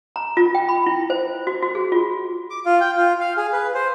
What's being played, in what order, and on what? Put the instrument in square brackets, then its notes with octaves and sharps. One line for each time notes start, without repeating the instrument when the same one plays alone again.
[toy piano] A#5
F4
G5
B5
E4
C5
F#4
F#4
G#4
F4
[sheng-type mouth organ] D6
F4
G5
F4
F5
G#4
B4
C5